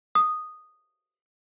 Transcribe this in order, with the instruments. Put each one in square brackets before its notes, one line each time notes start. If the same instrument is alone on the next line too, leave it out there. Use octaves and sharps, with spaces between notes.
[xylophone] D#6